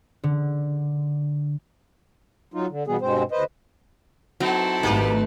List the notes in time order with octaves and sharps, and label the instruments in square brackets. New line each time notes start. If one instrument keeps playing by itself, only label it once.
[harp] D3
[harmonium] F#3 D#4 F4
D3
B2 E3 G3 B3 G#4
G2 B2 G#3 C4 C5
D2 B4 C5 D#5
[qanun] F#3 D#4 [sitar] B3 [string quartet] C4 E4 A4
[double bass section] G#1 A3 [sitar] A#3 G4 [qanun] D#4 B4